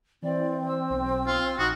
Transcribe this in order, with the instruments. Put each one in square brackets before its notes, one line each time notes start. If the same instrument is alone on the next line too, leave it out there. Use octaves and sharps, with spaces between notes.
[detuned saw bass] E3 [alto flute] C4 [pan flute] D5
[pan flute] E6
[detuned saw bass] B1
[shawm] F4
[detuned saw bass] A#1 [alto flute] D#4 [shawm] F#4 [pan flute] D#6